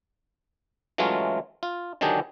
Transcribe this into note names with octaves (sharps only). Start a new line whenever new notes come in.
E3 F#3 G#3 A3 C#4 F4
F4
D3 D#3 F#3 D4 G4 G#4